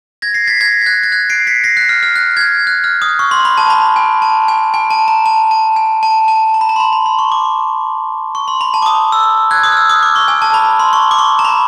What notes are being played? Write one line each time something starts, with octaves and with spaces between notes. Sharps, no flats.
G#6 A#6
A#6 C7
A6 B6
G#6 A#6
A6
F#6 G#6
A6
F#6 G#6
C7 D7
B6 C#7
A#6 C7
F#6
F6
F6
F#6
G#6
G6
F#6
F6
D#6
C#6
C6
B5
A5
B5
G#5
A5
G#5
G#5
A5
A#5
A5
A5
G#5
A5
A5
A#5
B5
A#5
C6
B5
B5
C6
C#6
D6
C#6
C6
B5
A5
D6
D#6
E6
F#6 G#6
D#6
F6
E6
D#6
D6
C#6
G#5
A5
B5
C6
C#6
D6
C#6
A#5
B5